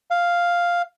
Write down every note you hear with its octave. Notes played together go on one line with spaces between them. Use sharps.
F5